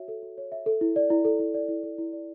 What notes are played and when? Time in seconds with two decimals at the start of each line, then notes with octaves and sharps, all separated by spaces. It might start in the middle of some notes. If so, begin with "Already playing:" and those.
Already playing: F#4 C#5 E5
0.08 A4
0.23 F#4
0.38 C#5
0.52 E5
0.66 A4
0.81 E4
0.96 D5
1.10 E4
1.25 A4
1.39 E4
1.54 D5
1.69 E4
1.83 A4
1.98 E4
2.13 D5